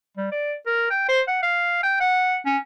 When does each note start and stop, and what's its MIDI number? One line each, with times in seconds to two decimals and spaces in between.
0.17 0.28 55
0.32 0.55 74
0.66 0.87 70
0.90 1.06 79
1.08 1.21 72
1.28 1.41 78
1.42 1.80 77
1.83 1.99 79
2.00 2.37 78
2.46 2.58 61